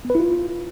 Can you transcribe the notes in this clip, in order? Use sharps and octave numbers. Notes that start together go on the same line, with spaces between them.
B3
B4
E4
F4